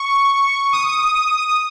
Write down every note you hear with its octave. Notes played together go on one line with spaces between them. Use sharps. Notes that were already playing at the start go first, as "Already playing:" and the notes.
Already playing: C#6
D#6